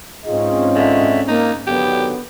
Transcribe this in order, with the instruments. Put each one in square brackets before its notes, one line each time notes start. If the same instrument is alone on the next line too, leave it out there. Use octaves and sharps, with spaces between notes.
[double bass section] G#2 C4 C#4 [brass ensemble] D#4 F4 D#5 [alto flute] G#4
[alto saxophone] D3 [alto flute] E5
[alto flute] A#3 [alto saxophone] D#4
[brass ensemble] D3 D#3 F#3 [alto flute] B3 [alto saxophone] G4